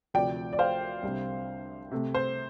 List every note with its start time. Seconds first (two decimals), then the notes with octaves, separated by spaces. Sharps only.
0.14 D2 C3 F3 D5 G5
0.53 D5
0.59 C5 F5
1.03 C2 C3 G3 D4
1.91 C3 A3 C4
2.14 C5